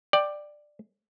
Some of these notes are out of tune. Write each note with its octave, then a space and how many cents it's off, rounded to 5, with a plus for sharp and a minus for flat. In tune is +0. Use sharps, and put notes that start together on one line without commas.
D5 +10 G5 +0